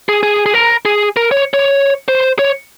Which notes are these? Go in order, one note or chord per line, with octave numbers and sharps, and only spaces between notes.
G#4
G#4
G#4
A#4
G#4
A#4
C#5
C#5
C5
C#5